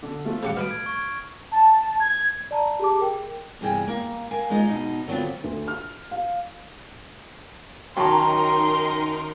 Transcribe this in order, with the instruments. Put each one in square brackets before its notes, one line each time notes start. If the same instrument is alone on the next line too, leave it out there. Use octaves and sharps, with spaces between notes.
[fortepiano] D3
F3 A3 F4
[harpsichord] C#3 G4 F#5
[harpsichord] B2 B5 D#6 [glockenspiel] F6 D7
[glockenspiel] G#6
C#6 G#6
[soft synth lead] A5
G#6
[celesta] D5 A5 A#5
G4 G#4 A5 D6
G#4 A#4 G5
[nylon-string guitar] E2 G2 C3 G#4 G5
A#3
A#4 F5 G#5
G#3 D#4 F4 D#5
B2 D#4
D3 F#3 B3 C4 F4
[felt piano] D2
F6
F5
[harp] F#2 D#3 [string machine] D#4 A#4 [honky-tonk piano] G5 A5 A#5 [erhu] C6